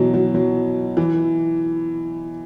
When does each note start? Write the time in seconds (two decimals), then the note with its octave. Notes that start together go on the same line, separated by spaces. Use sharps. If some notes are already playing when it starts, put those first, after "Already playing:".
Already playing: B2 E3 F#3
0.14 F#3
0.35 F#3
0.97 E3